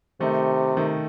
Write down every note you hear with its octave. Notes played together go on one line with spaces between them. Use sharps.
C3 D#3 A3 D#4
D#3 A3 D#4